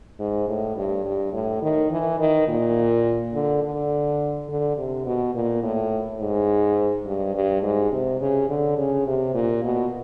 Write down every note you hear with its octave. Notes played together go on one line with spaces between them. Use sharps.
G#2
A2
G2
G2
A2
D#3
E3
D#3
A#2
D3
D3
D3
C3
B2
A#2
A2
G#2
G2
G2
G#2
C3
C#3
D3
C#3
C3
A#2
B2